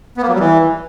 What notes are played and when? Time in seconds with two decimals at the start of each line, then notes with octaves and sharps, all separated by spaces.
0.17 B3
0.23 A#3
0.28 F#3
0.34 G3
0.40 E3